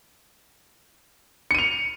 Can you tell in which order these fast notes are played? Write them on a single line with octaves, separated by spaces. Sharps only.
C#7 D#7 F7